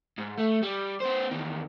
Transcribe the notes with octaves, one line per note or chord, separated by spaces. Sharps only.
G#2
A3
G3
B3 C5
E2 D#3